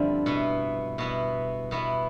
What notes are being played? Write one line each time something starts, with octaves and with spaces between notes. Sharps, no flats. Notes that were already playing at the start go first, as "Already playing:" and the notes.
Already playing: G2 D3 F3 C4 E4
B2 B3 E4
B2 B3 E4
B2 B3 E4